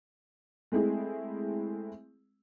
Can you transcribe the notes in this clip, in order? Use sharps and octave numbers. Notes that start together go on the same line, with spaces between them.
G#3 A3 C4 E4 G#4